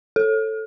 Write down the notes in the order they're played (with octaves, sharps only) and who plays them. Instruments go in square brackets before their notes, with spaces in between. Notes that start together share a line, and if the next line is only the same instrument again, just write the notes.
[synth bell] A4